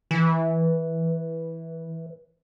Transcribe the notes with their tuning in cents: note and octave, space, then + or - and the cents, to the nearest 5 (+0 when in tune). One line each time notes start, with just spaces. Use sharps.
E3 -10